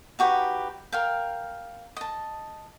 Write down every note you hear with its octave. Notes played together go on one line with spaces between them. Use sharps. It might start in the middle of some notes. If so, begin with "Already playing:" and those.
D#4 F#4 G4 B4
A#4 F5 G5
D#5 A5